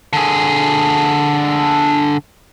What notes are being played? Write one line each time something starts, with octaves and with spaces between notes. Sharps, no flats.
D3 G#4